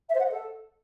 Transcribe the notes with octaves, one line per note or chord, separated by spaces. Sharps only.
E5
C5
F#5
D#5
A4